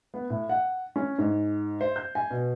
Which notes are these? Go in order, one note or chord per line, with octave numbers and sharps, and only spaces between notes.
B3
A2
F#5
C#4
G#2
C5
G6
G#5
B2